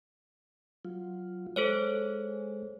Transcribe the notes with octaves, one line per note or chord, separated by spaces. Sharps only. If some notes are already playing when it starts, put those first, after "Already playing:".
F#3 F4
G#3 A4 C5 C#5